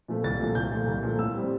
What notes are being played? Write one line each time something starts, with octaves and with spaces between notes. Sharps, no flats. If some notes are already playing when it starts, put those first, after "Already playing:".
A#2 F3 A3
C2 A6
A#2 F3 A3
C2 G6
A#2 F3 A3
C2
A#2 F3 A3
A2 E6
G3 C4